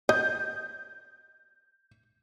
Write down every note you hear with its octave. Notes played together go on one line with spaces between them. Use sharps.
D#5 G6